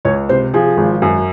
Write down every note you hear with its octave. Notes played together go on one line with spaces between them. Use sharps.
C#2 C#5
C3 C5
F3 G#4
G#1
F#2